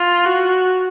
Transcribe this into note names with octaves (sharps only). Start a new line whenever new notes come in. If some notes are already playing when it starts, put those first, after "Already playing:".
Already playing: F4
F#4